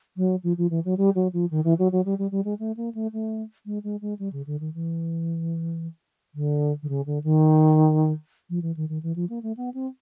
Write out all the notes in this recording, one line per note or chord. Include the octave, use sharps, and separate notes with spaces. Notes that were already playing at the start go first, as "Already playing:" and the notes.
F#3
F3
F3
E3
F#3
G3
F#3
F3
D#3
E3
F#3
F#3
G3
G3
G3
G#3
A3
A#3
A3
A3
G#3
G#3
G#3
G3
C#3
D3
D#3
E3
D3
D3
C#3
D3
D#3
F3
E3
D#3
D#3
E3
F3
A#3
A3
B3
C4